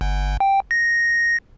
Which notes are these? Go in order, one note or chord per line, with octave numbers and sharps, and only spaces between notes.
G1
G5
A#6